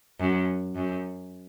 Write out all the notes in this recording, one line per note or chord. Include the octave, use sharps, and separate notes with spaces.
F#2
F#2